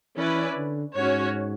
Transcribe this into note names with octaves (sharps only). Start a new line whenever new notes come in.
E3 C#4 E4 B4 D5
D3
G#2 C#4 F#4 C#5